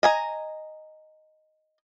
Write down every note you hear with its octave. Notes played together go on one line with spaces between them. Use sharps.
D#5 G#5 A#5